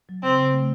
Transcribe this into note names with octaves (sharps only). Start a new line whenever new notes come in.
F#3
C#3 C4
C#3
A3